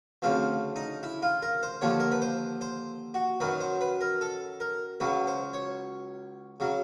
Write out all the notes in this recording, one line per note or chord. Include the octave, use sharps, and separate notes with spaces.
D2 C#3 F3 C4
D#4
E4
F4
A#4
C5
D#2 D3 F3 C#5
A#4
B4
C5
C5
F#4
F#2 D#3 F#3 B4
C5
B4
A#4
A4
A#4
C#2 C#3 F#3 B4
C5
C#5
C#3 F#3